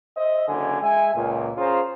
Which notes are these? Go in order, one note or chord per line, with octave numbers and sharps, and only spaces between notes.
C5 D#5 E5
F#1 D3 G#5
G#3 E5 G#5
C#2 A#2
C#4 F4 G#4 C5 A#5